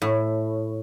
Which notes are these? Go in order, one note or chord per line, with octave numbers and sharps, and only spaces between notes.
A2